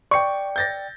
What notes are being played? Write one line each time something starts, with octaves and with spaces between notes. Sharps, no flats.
D5 G5 C#6 C#7
G6 A6 A#6